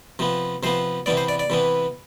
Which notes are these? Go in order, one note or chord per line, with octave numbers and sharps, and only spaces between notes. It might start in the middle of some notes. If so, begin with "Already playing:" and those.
C3 F3 B3
C3 F3 B3 C5
C3 E3 B3 D5
C5
D5
D5
C3 E3 B3